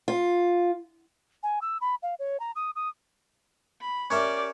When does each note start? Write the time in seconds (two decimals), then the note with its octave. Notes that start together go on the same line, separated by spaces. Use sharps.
0.08 F4
1.43 G#5
1.62 E6
1.81 B5
2.03 F5
2.19 C#5
2.40 A#5
2.56 D#6
2.76 D#6
3.81 B5
4.10 C#4 G4 A#4 D5 E5